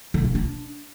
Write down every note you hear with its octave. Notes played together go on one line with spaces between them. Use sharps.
D3
C#3
D4